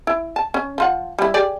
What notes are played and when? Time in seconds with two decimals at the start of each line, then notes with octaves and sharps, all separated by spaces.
0.07 E4
0.36 A5
0.54 C#4
0.78 F3 F4 F#5
1.19 G3 E4
1.34 G4 G#4 D5